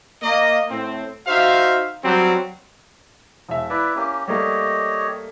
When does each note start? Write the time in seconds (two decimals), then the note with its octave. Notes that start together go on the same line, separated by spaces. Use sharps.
0.23 A#3 D#5
0.71 A2 C4
1.27 D#4 F#4 C5 E5 F5
2.04 F#3 G3 C4
3.49 E1 E5
3.70 E4 B4 D5 E5
3.96 A#3 C#4 G4
4.28 G3 A3 A#3 G4 C#5 D#5